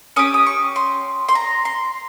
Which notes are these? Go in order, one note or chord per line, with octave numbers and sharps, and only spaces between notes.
C#4 G4 D#6
D#6
C#6
C6
C6
A#5
C6